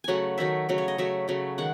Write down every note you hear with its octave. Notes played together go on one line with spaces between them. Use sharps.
C#3 F#3 A3 F#5 G#5
D#3 F#3 A3 E5
C#3 F#3 A3
C#5
D#5
C#3 F#3 A3 E5
C#3 F#3 A3
D#3 G#3 F#5